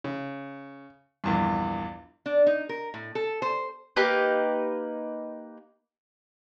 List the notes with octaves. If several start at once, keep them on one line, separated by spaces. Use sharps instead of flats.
C#3
A#1 E2 G2
D4
D#4
A#4
A2
A4
C5
A#3 D#4 G4 B4